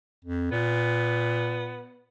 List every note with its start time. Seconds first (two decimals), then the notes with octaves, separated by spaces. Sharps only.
0.25 F2
0.51 A#2 B3